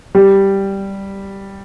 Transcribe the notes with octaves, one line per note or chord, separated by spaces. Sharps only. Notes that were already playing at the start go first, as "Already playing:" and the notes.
G3